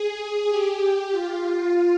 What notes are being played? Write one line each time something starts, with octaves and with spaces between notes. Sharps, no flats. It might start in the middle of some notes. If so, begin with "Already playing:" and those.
Already playing: G#4
G4
F4